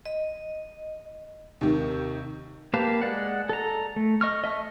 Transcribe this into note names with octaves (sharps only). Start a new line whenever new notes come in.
D#5
D#2 C3 D#3
A#3 G4 B4 F5 A5
G#3 D5 F#5
A4 A#5
A3
D#5 C#6 F6
D#5 E5 A5 C#6